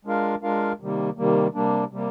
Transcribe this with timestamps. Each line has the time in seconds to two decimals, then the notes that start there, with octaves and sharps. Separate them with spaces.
0.05 G#3 D4 F4 A#4 F5
0.42 G#3 D4 F4 A#4 F5
0.80 C3 D#3 G3 A#3
1.17 C3 D#3 G3 A#3
1.54 C3 G3 A#3 D4
1.91 C3 G3 A#3